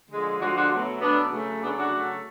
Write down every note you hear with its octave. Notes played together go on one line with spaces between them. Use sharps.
D3 F3 G#3
D3 F3 G#3 D4 F#4
D4 F#4
B2 F#3 A3
B2 F#3 A3 B3 D4
C#3 F#3 A3
C#3 F#3 A3 B3 D4
D4 F#4
C#3 F#3 A3